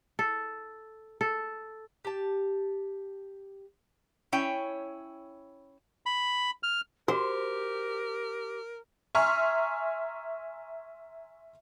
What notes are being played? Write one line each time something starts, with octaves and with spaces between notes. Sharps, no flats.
A4
A4
G4 A5
C#4 E4 C#5 G5
B5
F6
F#4 G4 A#4 C5
E5 G#5 A#5 C6 C#6 F6